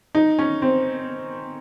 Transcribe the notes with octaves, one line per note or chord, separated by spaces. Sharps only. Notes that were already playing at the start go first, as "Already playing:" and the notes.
D#4
C#4
C4